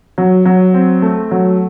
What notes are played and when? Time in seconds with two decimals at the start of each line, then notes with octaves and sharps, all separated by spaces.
0.18 F#3
0.46 F#3
0.74 C4
1.02 A3
1.31 F#3